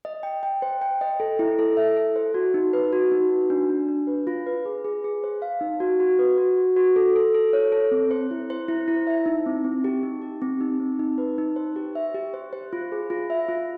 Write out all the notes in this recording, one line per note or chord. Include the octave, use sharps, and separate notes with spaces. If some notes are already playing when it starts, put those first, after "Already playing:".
D#5
G5
G5
C5
G5
D#5
A4
E4
A4
E5
A4
C5
F#4
D#4
B4
F#4
D#4
F#4
D4
D4
D4
B4
F4
B4
G#4
G#4
G#4
C5
F5
D#4
F#4
F#4
B4
F#4
F#4
F#4
A4
A4
A4
C#5
A4
C4
C5
E4
C5
E4
E4
E5
D#4
C4
C4
G4
D#4
G4
C4
D#4
C4
D#4
B4
D#4
C5
G4
E5
G4
C5
C5
F4
G#4
F4
E5
F4